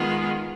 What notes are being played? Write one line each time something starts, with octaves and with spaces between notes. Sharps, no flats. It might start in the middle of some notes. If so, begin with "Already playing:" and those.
Already playing: D#3 G#3 B3 F4